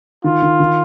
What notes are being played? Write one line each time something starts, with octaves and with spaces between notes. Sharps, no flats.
D#3 F4
D#3
D#3